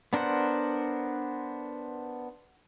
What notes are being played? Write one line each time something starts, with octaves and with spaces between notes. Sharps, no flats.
B3 D4 A#4 C5 F#5